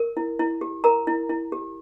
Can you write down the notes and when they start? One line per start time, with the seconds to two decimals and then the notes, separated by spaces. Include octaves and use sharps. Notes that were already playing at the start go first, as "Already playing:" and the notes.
Already playing: A#4
0.17 E4
0.39 E4
0.61 G4
0.84 A#4 A#5
1.07 E4
1.29 E4
1.52 G4